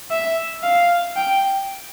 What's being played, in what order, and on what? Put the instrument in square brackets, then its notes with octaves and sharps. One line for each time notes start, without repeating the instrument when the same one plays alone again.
[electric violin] E5
F5
G5